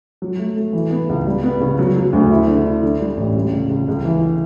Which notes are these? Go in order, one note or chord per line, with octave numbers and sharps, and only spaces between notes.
F#3
A3
A3
E3
B3
C#2
G3
B3
C#3
F#3
F#3
D2
E4
D3
E4
D3
G3
A1
G3
C#2
C#2
C#2
E3